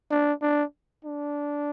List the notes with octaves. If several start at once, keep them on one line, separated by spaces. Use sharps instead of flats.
D4
D4
D4